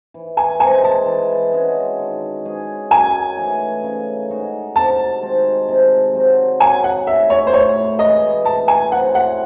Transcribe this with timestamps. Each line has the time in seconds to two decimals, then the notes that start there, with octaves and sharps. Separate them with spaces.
0.14 E3
0.37 G#5
0.60 G#3 C4 G#5
0.84 A5
1.06 E3
1.53 G#3 C#4 F#4
1.99 D#3
2.45 G#3 C#4 G#4
2.91 F#2 G#5
3.37 E3 A3 D#4
3.83 C#3
4.30 G#3 D#4 F#4
4.76 C3 A5
5.22 D#3 G#3 C4
5.68 C3
6.14 F#3 C4 F#4
6.60 F#3 G#5
6.84 F#5
7.07 A3 D#4 G#4 E5
7.30 C#5
7.47 C5
7.53 A2 C#5
7.99 E3 G#3 D#5
8.45 A2 A5
8.68 G#5
8.92 F#3 C4 E4 F#5
9.15 F#5